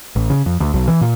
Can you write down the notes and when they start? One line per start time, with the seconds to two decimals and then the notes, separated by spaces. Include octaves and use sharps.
0.16 A1
0.30 C#3
0.46 F2
0.60 D2
0.74 B1
0.88 E3
1.01 A#2